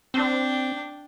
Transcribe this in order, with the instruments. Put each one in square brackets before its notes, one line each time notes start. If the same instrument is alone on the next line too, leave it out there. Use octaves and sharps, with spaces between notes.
[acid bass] C4 [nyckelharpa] D4 G5